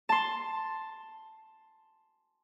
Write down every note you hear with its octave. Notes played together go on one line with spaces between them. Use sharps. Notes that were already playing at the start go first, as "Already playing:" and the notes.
A5 C6